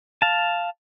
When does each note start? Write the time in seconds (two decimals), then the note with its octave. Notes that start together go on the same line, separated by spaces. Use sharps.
0.22 F5 A5